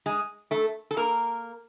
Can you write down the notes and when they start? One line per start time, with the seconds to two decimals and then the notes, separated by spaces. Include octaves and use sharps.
0.06 G#3 G#4
0.51 A3 A4
0.91 A4
0.97 A#3 A#4